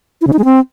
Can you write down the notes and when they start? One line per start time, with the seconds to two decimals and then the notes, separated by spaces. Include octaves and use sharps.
0.21 E4
0.27 C#3
0.33 D#4
0.39 G#3
0.45 C4